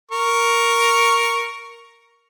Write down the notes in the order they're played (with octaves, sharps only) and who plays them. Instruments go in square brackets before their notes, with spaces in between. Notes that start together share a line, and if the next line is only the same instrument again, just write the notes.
[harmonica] A#4 C#6